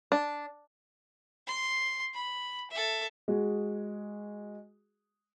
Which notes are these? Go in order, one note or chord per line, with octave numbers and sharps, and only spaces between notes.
D4
C6
B5
A4 E5
G#3 F#4 G#4